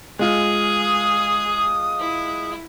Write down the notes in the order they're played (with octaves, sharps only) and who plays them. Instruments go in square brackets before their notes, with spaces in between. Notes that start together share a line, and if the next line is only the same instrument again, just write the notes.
[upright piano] G#3 F4 [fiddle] G#4
[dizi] D#6
[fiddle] E4